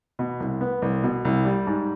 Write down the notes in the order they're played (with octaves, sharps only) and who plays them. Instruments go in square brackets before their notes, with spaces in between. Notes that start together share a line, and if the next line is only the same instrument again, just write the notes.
[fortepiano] B2
C2
B3
C2
B2
C2
G3
G#2